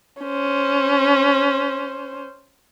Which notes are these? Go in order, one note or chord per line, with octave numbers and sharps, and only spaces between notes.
C#4 C5